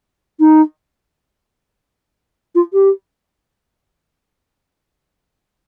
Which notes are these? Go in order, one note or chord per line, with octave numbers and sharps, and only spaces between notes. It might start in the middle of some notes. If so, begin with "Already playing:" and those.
D#4
F4
G4